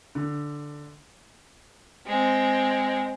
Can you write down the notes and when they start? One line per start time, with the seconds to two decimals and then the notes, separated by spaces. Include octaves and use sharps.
0.15 D3
2.06 G#3 C4